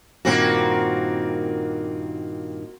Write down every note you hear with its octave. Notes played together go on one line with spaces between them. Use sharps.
G2 A#2 D#3 A#3 C4 F#4